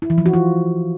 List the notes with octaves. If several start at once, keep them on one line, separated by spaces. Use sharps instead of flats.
E4
E3
F3
F#4
F4